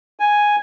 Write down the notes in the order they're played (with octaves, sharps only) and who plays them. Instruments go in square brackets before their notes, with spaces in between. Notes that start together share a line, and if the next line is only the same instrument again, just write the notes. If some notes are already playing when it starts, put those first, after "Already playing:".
[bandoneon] G#5